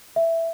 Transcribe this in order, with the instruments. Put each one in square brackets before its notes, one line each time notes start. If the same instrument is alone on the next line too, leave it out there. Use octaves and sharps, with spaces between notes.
[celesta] E5